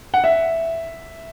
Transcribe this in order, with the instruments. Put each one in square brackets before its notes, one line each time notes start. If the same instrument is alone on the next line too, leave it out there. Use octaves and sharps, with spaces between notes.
[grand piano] F#5
E5